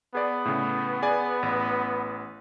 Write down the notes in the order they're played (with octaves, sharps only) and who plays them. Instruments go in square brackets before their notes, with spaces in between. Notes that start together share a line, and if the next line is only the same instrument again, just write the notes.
[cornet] B3 [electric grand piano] G#4 D5
[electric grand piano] A2 C#3
G#4 D5 G#5
A1